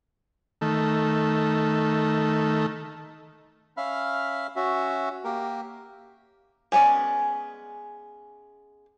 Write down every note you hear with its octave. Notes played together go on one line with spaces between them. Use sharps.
D#3 A3
C#4 E5 F5 B5 F6
C#4 F#4 E5
A#3 G4 A#4
G#3 B3 C#4 D5